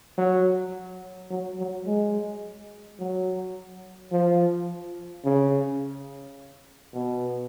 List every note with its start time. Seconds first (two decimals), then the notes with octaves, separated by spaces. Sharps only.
0.18 F#3
1.31 F#3
1.59 F#3
1.86 G#3
3.00 F#3
4.12 F3
5.25 C#3
6.94 B2